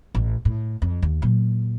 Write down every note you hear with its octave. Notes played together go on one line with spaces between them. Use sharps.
A1
A2
F2
D#2
A#2 F#3